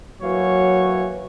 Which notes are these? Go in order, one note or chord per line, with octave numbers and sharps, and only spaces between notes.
E3 F#3 A#3 C#5